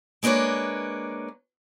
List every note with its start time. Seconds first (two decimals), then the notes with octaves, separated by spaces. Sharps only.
0.23 G#3 A#3 D4 B4 C#5